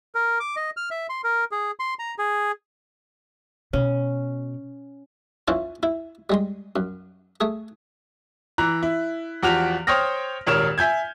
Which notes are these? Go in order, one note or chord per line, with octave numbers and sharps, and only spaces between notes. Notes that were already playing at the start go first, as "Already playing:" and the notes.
A#4
D6
D#5
F6
E5
C6
A#4
G#4
C6
A#5
G#4
B2 C#4
E3 C#4 E4 F4 C5
E4
G3 G#3 C6
F#2
A3 G#4
E3 A#5 F#6
E4
E2 F3 F#4 G4 F6 F7
C5 C#5 G5 D#6 F6 A#6
D#1 G#1 A#4 C#5 F6 E7
E5 G#5 G6 G#6